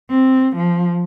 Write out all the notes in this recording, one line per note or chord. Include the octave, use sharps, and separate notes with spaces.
C4
F3